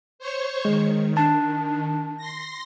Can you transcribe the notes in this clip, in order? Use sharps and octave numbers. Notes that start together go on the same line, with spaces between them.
C5 C#5 C#6
D#3 G#3
D4 A5
C6 A#6